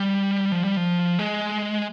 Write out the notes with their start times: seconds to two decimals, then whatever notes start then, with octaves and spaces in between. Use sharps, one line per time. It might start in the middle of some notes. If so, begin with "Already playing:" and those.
Already playing: G3
0.52 F3
0.64 G3
0.77 F3
1.19 G#3